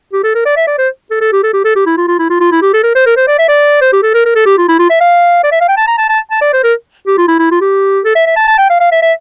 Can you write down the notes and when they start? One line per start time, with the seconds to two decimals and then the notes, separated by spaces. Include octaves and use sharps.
0.13 G4
0.24 A4
0.35 A#4
0.46 D5
0.56 E5
0.67 D5
0.78 C5
1.11 A4
1.21 A4
1.33 G4
1.43 A4
1.54 G4
1.65 A4
1.76 G4
1.86 E4
1.98 F4
2.08 F4
2.19 E4
2.30 F4
2.41 F4
2.52 E4
2.62 G4
2.74 A4
2.84 A#4
2.95 C5
3.06 A#4
3.17 C5
3.28 D5
3.39 E5
3.49 D5
3.82 C5
3.93 G4
4.03 A4
4.14 A#4
4.26 A#4
4.36 A4
4.46 G4
4.58 F4
4.69 E4
4.79 F4
4.90 E5
5.01 F5
5.44 D5
5.52 E5
5.61 F5
5.69 G5
5.77 A5
5.88 A#5
5.98 A5
6.09 A5
6.31 A5
6.41 D5
6.53 C5
6.64 A#4
7.07 G4
7.18 F4
7.28 E4
7.39 E4
7.51 F4
7.61 G4
8.05 A4
8.16 E5
8.27 E5
8.37 A5
8.48 A5
8.58 G5
8.70 F5
8.80 F5
8.92 E5
9.03 E5